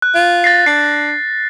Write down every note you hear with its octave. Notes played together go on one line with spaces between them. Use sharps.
F#6
F4
A6 A#6 C7
D4 C7